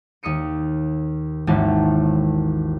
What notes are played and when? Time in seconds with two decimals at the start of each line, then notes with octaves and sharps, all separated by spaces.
0.23 D#2 D#6 E6 C#7 D#7
1.47 G#1 D#2 E3 F#4 A5